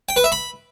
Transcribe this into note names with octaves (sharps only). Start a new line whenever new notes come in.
G5
B4
E5
B5